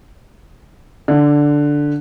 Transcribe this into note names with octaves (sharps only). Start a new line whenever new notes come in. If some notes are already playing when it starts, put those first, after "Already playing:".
D3